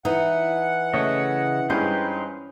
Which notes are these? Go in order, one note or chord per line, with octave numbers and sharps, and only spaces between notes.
E3 D#4 F#5
C#3 A3 C#5 D#5 E5
G2 G#3 C#4 D#4 B4 C5 G5